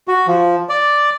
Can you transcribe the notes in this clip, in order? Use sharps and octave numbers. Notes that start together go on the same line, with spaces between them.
F#4
F3
D5